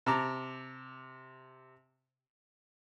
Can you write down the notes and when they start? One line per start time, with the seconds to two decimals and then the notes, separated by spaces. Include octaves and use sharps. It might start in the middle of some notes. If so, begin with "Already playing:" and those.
0.06 C3 A5 A#5 D6